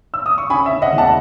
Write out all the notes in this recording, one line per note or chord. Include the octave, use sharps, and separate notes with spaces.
E6
D#6
C#6
C#3 G#5 B5
E5
C#3
D#5 F#5
E2
F#5 A5